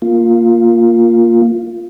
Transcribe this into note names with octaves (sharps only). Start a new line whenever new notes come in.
A#3 F4